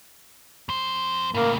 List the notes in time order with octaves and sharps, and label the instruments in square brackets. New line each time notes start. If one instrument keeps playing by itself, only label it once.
[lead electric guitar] F2 C5
[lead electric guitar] A2 C#3 [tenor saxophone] A#3